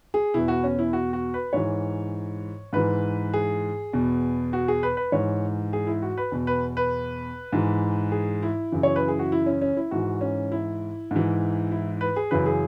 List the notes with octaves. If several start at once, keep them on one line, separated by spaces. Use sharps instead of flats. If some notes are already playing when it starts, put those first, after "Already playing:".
G#4
E2 B2 E4
F#4
C#4
E4
F#4
F#4
B4
G#2 E3 C#5
G#2 E3 B4
G#4
E2 B2
F#4
G#4
B4
B4
G#2 E3 C#5
G#4
E4
F#4
B4
E2 B2
B4
B4
G#2 E3
G#4
E4
F#2 C#3 E3
C#5
B4
G#4
F#4
E4
C#4
C#4
E4
G#2 E3 F#4
C#4
E4
G#2 E3
E4
B4
G#4
F#2 C#3 E3 B4
G#4